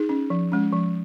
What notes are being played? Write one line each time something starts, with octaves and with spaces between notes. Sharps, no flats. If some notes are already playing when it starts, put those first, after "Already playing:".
Already playing: D#4 G#4
C#4
F3
G#3 C#4
F3